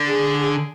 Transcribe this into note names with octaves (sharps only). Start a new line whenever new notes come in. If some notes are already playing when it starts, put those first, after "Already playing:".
Already playing: D3
G#4